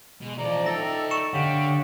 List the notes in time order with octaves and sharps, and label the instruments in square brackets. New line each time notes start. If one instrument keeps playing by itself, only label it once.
[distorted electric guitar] B2 [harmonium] G#3
[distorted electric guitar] E3 A4 [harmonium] F3 D5 A#5
[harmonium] D#4 E5 [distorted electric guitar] E4 G5 [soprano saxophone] A4 [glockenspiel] A#6
[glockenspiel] C#6 C#7 E7
[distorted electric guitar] D3 [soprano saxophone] G4 [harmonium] C#5 F5 F#5